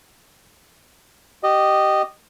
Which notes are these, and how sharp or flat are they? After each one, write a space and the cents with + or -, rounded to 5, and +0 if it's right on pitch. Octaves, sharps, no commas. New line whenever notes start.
G4 -20 D#5 -15